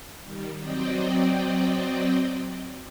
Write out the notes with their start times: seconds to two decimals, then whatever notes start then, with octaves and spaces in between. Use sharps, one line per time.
0.23 D#3 G3
0.57 F#3 C4 D5 D#5 G5